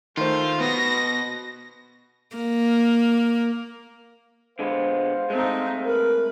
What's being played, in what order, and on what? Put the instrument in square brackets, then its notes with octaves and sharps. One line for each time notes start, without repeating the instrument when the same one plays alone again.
[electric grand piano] D#3 C5 [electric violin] A3 [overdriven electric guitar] F4
[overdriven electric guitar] B2 [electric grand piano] B3 [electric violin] A#6
[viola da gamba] A#3
[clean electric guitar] D3 G#3 B3 [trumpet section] C5 F5
[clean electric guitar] G#3 A3 [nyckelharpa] C4 D#4
[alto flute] A#4 [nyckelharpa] B4